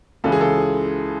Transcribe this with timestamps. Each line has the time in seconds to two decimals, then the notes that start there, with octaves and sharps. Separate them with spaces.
0.24 C#2 C#3 E3 G#3 A4
0.32 G#4
0.41 A4